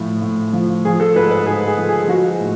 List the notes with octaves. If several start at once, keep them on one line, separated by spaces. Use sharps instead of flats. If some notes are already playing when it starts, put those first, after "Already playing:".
Already playing: A2 F3
A2
F3
F3 G#4
A4
G#2 B4
B4
G#2 G#4
G#4
F3
G#4
F3 F#4
A2